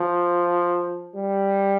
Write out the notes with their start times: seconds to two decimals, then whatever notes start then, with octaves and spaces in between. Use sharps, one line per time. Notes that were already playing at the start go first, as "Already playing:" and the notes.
Already playing: F3
1.15 G3